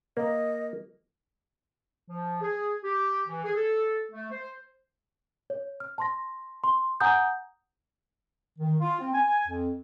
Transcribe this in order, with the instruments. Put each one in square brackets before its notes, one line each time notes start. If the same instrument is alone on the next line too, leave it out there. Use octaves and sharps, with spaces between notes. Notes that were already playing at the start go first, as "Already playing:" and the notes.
[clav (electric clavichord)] A#3 [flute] D#5
[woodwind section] F3
G#4
G4
E3
G#4
A4
A3
C5
[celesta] C#5
F6
A5 C6 A#6
C6
F#5 G#5 A#5 D#6 G6
[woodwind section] D#3
F4
C4
G#5
F2